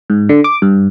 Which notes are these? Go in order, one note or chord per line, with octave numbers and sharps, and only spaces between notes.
G#2
D3
D6
G2